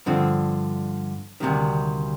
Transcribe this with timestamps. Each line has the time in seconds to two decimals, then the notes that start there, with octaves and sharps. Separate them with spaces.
0.06 G2 D3 F3 C4
1.40 D2 C3 D#3 G3